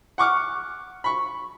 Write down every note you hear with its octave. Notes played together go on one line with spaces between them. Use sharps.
F#5 C#6 D6 F6
B5 C#6